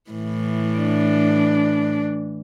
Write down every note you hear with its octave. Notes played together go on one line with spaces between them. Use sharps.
A2 E3
D4